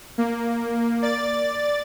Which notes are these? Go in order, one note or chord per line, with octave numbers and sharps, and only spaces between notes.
A#3
D5 A6